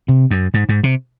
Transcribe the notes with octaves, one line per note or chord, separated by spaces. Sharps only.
C3
F#2
G#2
G#2
C3